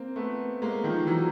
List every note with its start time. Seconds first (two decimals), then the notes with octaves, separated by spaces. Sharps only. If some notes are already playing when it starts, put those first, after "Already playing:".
Already playing: A#3 C4
0.16 A3 B3
0.62 G#3 A#3
0.84 D#3 F3
1.07 E3 F#3